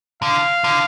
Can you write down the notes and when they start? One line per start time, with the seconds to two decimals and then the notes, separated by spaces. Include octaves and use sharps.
0.22 D3 F5
0.64 D3